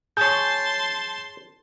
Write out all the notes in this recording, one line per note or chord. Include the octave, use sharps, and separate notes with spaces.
G#4 C#5 A5 C6 G6